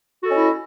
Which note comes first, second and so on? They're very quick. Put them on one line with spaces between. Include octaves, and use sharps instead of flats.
F#4 A4 D#5 C#4 E4